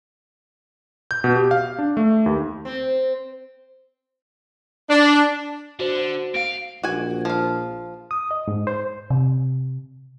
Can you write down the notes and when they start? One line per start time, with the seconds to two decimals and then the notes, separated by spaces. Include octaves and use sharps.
1.11 G6
1.24 B2
1.36 G4
1.51 F5
1.79 D4
1.97 A3
2.26 D#2
2.65 C4
4.89 D4
5.79 D3 F#4 C5
6.34 D#2 F5 D7
6.83 A#1 F#4 G#5
7.25 F3 F5
8.11 D#6
8.31 D#5
8.48 G#2
8.67 C5
9.10 C3